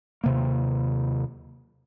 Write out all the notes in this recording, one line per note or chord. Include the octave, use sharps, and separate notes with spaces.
D#2 C3 A#3